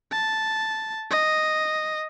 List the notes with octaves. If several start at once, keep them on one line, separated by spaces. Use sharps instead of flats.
A5
D#5